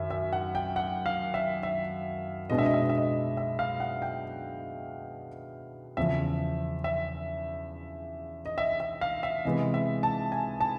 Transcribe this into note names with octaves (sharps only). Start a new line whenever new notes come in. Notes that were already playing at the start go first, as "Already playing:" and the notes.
Already playing: F#2 D#3 F#3 E5
E5
F#5
G5
F#5
F5
E5
E5
B2 G#3 B3 D4 D#5
E5
D#5
E5
D#5
E5
D#5
E5
F5
F#5
G5
E2 C#3 F3 E5
E5
D#5
E5
E5
F5
E5
C3 E3 G#3 B3 D#5
E5
A5
G#5
A5